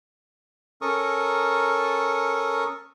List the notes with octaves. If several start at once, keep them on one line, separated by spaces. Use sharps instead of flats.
C#4 A4 A#4 C#6 D#6